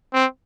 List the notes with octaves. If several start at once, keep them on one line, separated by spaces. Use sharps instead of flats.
C4